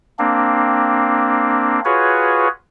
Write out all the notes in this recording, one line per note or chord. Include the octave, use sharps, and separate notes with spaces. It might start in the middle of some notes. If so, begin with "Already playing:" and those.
A#3 C4 D4
F4 F#4 G#4 B4 C#5